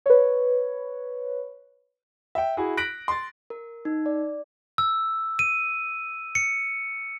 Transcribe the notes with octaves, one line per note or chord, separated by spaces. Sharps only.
B4 C#5
E5 G5
E4 F#4 G#4
F#6 A#6 B6 D7 F#7
C6 A6
A#4
D#4
D5
E6
D#7
C#7